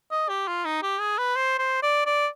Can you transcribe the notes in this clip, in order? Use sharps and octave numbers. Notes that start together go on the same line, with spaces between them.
D#5
G4
F4
D#4
G4
G#4
B4
C5
C5
D5
D5